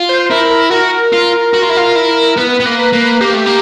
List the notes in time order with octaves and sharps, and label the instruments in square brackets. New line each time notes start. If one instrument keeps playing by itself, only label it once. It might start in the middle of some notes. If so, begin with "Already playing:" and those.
Already playing: [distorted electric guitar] F4
[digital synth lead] C5
[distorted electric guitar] E4 [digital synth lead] A#4
[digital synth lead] A#4
[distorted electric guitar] F#4 [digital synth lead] A#4
[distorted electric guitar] F4
F#4
F4
E4
F4
E4
[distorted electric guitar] B3 [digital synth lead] B4
[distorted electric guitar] B3
A#3
[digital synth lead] B4
[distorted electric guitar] A#3
[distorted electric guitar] A#3 [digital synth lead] G4
[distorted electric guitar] A3
A#3